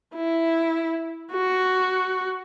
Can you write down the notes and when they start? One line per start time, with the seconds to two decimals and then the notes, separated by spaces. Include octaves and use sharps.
0.15 E4
1.32 F#4